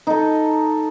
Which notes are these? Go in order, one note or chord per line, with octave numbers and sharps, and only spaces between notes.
D#4 A4